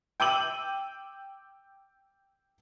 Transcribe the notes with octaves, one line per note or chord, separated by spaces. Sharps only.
G5 D6 E6 D#7 F#7